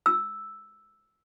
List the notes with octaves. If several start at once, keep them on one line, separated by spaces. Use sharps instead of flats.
E6